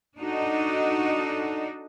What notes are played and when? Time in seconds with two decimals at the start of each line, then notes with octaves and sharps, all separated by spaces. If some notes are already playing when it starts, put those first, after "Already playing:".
0.18 D4 D#4 F#4 A4 D#5